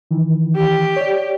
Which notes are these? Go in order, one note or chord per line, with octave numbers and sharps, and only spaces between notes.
D#3 E3
G4
C#5 D5